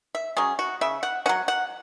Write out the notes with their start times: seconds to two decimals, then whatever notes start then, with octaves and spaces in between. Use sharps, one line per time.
0.15 E5
0.37 F#3 C#4 G#4
0.59 F#4
0.81 C#3 E5
1.03 F#5
1.26 F#3 C#4 F#5
1.48 F#5